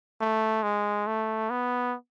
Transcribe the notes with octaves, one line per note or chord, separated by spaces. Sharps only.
A3
G#3
A3
B3